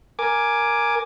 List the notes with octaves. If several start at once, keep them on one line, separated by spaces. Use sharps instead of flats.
A#4 G#5 D6